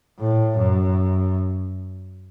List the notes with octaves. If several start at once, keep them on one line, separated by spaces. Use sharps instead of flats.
A2
F#2